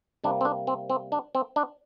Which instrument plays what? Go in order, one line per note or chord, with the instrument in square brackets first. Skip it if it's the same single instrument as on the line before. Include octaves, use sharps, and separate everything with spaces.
[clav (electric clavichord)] C3 G3 A#3 D4
C4
D4
C4
C4
D4
C4
D4